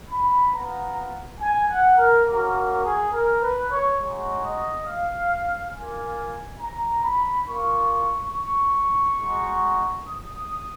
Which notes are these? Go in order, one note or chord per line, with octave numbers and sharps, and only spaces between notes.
B5
B3 F4 A#5
G#5
F#5
A#4
A#3 C#4 F#4 A#4
A#4
G#4
A#4
B4
C#5
G#3 D#4 F#4 C#5
D#5
F5
A#3 F4 G#5
A#5
B5
A#3 F4 C#6
C#6
G#3 D#4 F#4
D#6